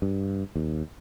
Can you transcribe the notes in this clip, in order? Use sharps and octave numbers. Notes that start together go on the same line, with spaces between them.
G2
D#2